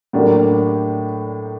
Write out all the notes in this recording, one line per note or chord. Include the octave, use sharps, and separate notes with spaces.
A2 F#3 A#3 D4 G4